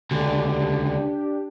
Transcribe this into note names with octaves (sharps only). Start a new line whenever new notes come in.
C#2 D3 D4 G4